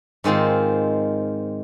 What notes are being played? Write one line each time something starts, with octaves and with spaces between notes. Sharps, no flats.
G#2 D#3 G#3 C4 F4